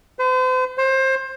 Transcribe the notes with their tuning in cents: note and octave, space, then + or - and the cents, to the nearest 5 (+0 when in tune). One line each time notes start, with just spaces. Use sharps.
C5 -40
C5 +25